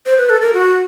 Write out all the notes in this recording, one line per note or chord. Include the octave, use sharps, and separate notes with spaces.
C5
B4
A4
A#4
F#4